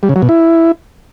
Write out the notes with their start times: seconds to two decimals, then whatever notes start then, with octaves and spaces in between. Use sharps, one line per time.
0.03 G3
0.09 C#3
0.16 F#3
0.22 B2
0.29 E4